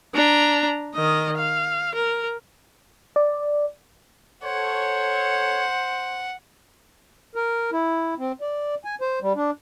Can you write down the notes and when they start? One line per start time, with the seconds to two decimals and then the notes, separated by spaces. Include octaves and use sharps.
0.14 D4 A#5
0.95 D#3 D#5
1.37 F5
1.94 A#4
3.16 D5
4.44 A4 C5 C#5 F#5
7.35 A#4
7.72 E4
8.18 C4
8.41 D5
8.85 G#5
9.01 C5
9.22 G3
9.36 D4